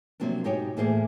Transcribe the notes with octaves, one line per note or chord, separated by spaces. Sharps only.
C3 F3 F#3 A#3 C4 D4
G#2 B2 D#4 G4 C#5 G5
A2 E3 A#3 G#4 C5 D5